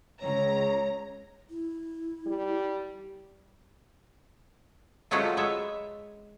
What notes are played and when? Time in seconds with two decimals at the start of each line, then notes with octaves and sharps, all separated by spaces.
0.21 C#2 C#5 A#5
1.50 E4
2.26 G3
5.11 F3 F#3 G#3 A3 C#4 F4
5.37 G#3 B4 C#5 E5